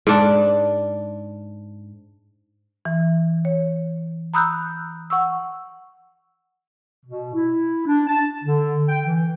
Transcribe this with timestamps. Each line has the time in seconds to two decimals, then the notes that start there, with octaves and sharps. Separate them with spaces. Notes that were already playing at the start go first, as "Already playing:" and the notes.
0.07 G#2 D4
2.85 E3
3.45 C#5
4.34 A#5 B5 D#6 E6 F#6 G6
5.10 F#5 C#6 E6
7.05 B2
7.33 E4
7.85 D4
8.07 A5
8.43 D3
8.88 G5
9.04 E3